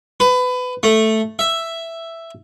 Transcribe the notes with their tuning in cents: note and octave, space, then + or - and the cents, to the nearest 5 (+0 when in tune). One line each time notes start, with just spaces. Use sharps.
B4 +25
A3 +0
E5 +5